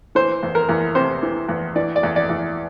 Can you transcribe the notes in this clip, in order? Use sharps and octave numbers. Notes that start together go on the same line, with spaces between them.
E3 C5
E2
A#4
E2
C3 C5
E3
E2
E3 D5
D5
E2
D5
E2